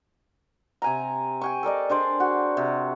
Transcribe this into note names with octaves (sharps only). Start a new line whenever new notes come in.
C3 G#5 A#5
G5 G#5 C#6
A4 A#4 D5 D#5
D4 G#4 C5 D5
F#4
C3